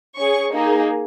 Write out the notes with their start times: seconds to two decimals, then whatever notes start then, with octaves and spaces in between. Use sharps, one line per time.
0.16 C#4 G#4 C#6
0.53 A#3 D#4 G#4